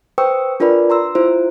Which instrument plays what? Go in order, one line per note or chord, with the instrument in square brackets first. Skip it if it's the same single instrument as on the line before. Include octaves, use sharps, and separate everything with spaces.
[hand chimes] B4 C5 G5 C#6 D#6 E6
D4 F4 A#4 B4 D5 B5
A#5 C6 E6
E4 F4 C5